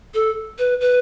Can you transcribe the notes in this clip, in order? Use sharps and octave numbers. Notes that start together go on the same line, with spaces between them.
A4
B4
B4